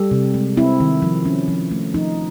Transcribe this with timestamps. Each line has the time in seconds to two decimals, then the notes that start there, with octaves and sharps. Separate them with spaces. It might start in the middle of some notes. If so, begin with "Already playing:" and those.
Already playing: G3 G4 A4
0.11 C3
0.34 G#3
0.57 C4 E4
0.80 D#3
1.02 F3
1.25 C#4
1.48 F3
1.71 A3
1.94 F3 D#4